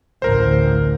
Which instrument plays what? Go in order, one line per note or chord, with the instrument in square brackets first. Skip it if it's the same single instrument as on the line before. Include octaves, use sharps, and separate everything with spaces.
[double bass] A1 D2 [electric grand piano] A#4 C5